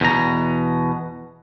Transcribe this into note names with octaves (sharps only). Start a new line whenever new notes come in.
E2 B2 A#5